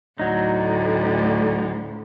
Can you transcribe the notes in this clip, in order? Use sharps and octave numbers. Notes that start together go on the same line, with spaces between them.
D2 A2 F#3 D#4